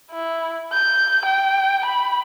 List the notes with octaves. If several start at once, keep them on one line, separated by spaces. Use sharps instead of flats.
E4
G6
G5
B5